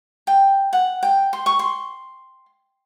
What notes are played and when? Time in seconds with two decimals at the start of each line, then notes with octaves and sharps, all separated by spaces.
0.27 G5
0.73 F#5
1.03 G5
1.33 C6
1.46 C#6
1.59 C6